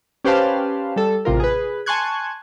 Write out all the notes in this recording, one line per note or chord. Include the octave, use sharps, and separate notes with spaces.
C#4 G4 B4 C5 F5 A5
G3 A4
A1 C3 F4 A#4
G#4 B4
G#5 A5 C6 C#6 F#6 G#6